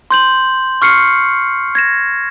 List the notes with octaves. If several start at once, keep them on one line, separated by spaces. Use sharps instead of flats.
C6 G6 F#7
C#6 F6 C7 C#7
G#6 A#6 E7